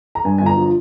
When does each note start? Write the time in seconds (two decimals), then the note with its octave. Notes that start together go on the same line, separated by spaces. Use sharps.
0.15 A#5
0.25 G2 G#5
0.38 G1 G#5
0.46 A#5
0.57 F3